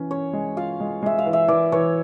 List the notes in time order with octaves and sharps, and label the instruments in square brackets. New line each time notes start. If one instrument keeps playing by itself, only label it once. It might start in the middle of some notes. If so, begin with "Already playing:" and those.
Already playing: [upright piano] E3 C#4
[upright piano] C#4 [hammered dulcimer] C#5
[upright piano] G#3
[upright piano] F4 [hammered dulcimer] F5
[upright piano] G#3
[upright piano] G#3 [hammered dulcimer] E5
[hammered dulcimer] F5
[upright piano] E3
[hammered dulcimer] E5
[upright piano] E3 [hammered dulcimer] D5
[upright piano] E3 [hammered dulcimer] C#5